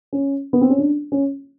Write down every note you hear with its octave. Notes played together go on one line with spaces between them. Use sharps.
C#4
B3
C4
C#4
D4
C#4